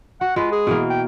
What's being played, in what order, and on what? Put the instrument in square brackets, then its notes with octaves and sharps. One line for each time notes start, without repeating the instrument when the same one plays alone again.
[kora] F#4 [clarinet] F#5
[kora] G#3 B4 [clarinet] F4
[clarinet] G#4
[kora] B2 E3 A#3
[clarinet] G5